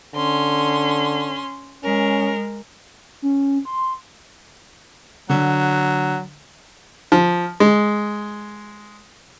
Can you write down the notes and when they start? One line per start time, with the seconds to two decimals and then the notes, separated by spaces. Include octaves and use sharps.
0.15 D3 C#4 C6
1.84 G#3 C#4 A#4
3.22 C#4
3.65 C6
5.30 D3 F#3
7.12 F3
7.60 G#3